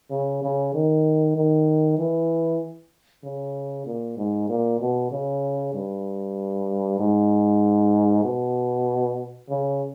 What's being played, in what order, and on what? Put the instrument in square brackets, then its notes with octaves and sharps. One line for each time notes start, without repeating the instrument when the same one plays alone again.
[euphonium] C#3
C#3
D#3
D#3
E3
C#3
A#2
G#2
A#2
B2
C#3
G2
G#2
B2
C#3